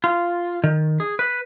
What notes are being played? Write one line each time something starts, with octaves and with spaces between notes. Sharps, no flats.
F4
D#3
G#4
B4